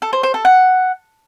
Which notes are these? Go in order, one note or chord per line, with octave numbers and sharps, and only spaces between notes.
A4
C5
C5
A4
F#5